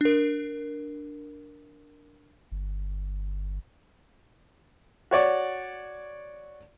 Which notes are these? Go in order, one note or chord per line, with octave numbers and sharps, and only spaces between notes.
D4 A#4
G1
F#4 C#5 D5